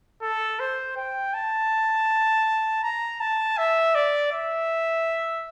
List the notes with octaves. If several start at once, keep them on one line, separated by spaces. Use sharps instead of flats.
A4
C5
G5
A5
A#5
A5
E5
D5
E5